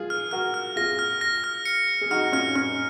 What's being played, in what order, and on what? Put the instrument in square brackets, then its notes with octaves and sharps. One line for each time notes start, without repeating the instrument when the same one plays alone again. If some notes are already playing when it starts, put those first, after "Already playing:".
Already playing: [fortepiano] F4 G#4
[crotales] F6
[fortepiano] F#4 A#4 [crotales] F6
[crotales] F6
[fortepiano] F4 G#4 [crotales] A#6
[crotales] F6
A#6
F6
C#7
C#7
[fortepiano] G#4
[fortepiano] D#4 F#4 [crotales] F6
[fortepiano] C#4 F4 [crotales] F6
[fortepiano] C#4 [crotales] F6